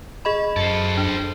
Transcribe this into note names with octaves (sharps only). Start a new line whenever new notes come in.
G#4 D#5 B5
F#2 A4 C5
D4